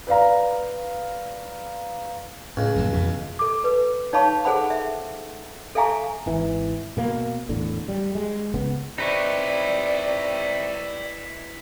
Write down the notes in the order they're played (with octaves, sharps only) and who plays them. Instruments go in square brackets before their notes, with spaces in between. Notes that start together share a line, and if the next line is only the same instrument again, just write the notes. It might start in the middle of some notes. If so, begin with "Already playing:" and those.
[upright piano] B4 D5 F5 A#5
[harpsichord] C#2 [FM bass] A2
[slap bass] F#2 F#3 A#3
[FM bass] F2 [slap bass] B2 D#3 E3
[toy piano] A4 D6
B4
D#4 C#5 F5 A5 B5 C#6
G#4 A4 C5 F#5 B5
E5
A4 E5 F5 G#5 A#5 C#6
[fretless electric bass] G#1 E3
B2 A#3
E2 A2 D3
G3
G#3
C#2 C#3 B3
[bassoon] C3 [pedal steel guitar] D#4 B4 C#6 [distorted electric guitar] E4 G4 [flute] D5